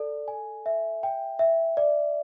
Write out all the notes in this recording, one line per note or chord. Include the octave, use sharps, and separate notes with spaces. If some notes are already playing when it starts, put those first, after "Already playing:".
Already playing: A4 D5
G#5
E5
G5
E5
D5